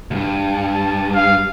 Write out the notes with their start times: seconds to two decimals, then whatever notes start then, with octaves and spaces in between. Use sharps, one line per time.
0.11 D2 G2
0.52 A5
1.15 F5